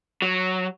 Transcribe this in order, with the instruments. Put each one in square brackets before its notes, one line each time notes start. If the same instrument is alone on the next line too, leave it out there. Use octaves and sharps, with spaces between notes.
[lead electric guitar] F#3